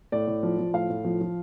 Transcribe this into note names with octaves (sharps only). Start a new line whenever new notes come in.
A2 D5
A2
F3
F3
A2 F5
A2
F3
F3